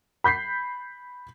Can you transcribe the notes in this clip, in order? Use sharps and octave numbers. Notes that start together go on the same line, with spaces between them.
B5 G6 B6 C7